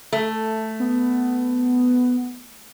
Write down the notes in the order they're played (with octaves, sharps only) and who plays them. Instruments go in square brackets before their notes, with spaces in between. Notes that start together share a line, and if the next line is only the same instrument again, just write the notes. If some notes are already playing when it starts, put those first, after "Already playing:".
[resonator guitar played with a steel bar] A3
[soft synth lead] B3